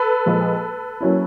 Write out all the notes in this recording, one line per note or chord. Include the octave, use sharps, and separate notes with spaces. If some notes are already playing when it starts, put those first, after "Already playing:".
Already playing: A4 B4
A#2 F3 G#3
F#3 A#3 C#4 E4